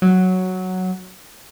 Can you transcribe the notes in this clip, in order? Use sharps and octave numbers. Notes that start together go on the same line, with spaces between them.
F#3